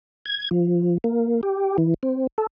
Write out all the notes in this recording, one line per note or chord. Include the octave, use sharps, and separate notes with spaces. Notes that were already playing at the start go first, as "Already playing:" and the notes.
G#6
F3
A#3
G4
E3
C4
A4